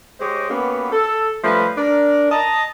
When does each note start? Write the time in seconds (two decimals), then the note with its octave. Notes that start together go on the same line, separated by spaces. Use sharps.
0.20 G#3 G4 C5 C#5 D#5
0.51 A#3 B3 C#4 F#4 G4 B4
0.93 A4
1.44 F3 G3 A3 C#4 F4 B4
1.78 D4 A#4
2.32 D#5 A5 A#5